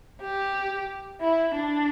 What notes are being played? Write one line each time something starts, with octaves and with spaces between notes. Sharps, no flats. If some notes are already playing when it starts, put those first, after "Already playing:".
G4
E4
D4